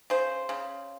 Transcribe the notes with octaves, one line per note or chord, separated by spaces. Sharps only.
C#3 C5
C#3